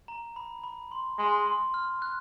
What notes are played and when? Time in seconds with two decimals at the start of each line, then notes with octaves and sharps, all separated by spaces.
0.08 A#5
0.36 B5
0.63 B5
0.92 C6
1.18 G#3 C6
1.47 C6
1.74 F6
2.02 F#6